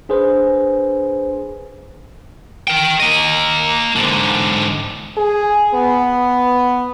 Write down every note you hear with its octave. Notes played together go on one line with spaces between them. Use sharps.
D4 G#4 B4 C5
A#4 G5
A#3 D#5
G#2 D3
G#4
B3